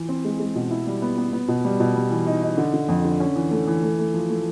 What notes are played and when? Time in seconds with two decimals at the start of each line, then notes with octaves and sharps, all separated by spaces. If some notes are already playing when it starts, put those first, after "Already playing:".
Already playing: E3
0.09 C4
0.25 G#3
0.40 G#3
0.55 B2
0.70 E4
0.87 G3
1.02 B3
1.18 B3
1.33 B3
1.48 B2
1.65 G3
1.80 B2
1.96 G3
2.11 E3
2.27 D#4
2.43 D#4
2.58 D3
2.73 D3
2.89 F2
3.05 D3
3.20 C#4
3.36 E3
3.51 A3
3.67 E3
3.83 A3
3.99 A3
4.14 F3
4.29 A3